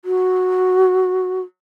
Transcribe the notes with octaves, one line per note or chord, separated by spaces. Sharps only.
F#4